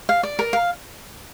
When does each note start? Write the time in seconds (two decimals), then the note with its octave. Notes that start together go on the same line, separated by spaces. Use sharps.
0.09 F5
0.23 D5
0.39 A#4
0.53 F5